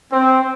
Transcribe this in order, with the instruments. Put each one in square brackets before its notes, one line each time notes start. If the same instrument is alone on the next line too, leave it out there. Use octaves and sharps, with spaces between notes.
[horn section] C4